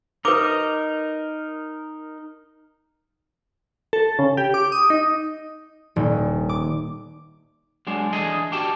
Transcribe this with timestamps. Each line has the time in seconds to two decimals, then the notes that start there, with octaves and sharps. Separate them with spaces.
0.25 D#4 A#4 B4 D#5 D6
3.93 A4
4.19 C#3
4.37 G4
4.54 D6
4.72 D#6
4.90 D#4
5.96 D#1
6.49 D6
7.87 F#3 G#3 D4
8.13 E3 D4 G#4 A4 D#5
8.52 F#4 G4 G5 A5